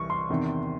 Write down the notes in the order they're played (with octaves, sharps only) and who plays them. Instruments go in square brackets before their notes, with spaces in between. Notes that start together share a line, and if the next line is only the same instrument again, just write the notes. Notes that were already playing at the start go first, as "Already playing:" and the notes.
Already playing: [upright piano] C2 C3 E3 C#6
C6
E2 C3 D#3